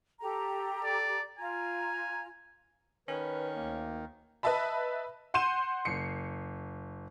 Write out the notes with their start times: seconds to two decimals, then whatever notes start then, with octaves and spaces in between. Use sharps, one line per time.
0.21 G4 A4 A#5
0.84 D5
1.38 F4 G#5 A#5
3.08 D#3 C#4 B4
3.54 D2 A#3
4.43 B4 D#5 E5 A5 B5
5.34 F#5 C6 G6 D#7 E7
5.85 F#1 C7 C#7